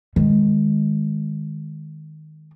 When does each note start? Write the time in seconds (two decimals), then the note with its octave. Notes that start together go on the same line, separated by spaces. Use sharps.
0.16 D#3 G#3